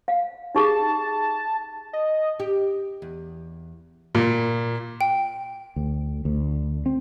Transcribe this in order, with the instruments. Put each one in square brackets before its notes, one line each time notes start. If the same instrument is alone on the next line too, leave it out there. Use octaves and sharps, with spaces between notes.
[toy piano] F5
[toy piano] D#4 G4 G#4 [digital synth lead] A5
[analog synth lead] D#5
[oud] G4
E2
[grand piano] A#2
[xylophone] G5
[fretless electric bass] D2
D2
C4